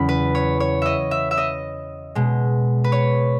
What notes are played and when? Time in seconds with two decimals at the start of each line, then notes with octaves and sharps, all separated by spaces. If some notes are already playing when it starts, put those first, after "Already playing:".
Already playing: E2 C#3 F#3 B5
0.09 B4
0.35 C#5
0.60 C#5
0.82 D#5 E5
1.11 E5
1.31 E5
1.38 D#5
2.15 B2 G#3
2.84 B4
2.92 C#5